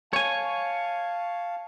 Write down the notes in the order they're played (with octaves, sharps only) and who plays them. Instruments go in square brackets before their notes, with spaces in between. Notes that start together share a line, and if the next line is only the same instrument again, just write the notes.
[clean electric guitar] C#5 G#5 [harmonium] F5 A5